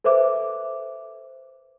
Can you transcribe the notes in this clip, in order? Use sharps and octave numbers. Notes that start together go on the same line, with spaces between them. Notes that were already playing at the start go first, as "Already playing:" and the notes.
A4 B4 C5 E5 D6